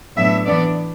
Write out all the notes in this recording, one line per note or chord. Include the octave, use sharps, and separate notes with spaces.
A2 F#3 B3 D4 E5
E3 B3 D4 D5